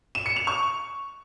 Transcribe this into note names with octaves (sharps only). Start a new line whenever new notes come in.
E7
C#7
F7
C#6